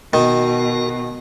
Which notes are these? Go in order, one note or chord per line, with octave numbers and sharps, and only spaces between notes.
B2 D#3 F#4 A#4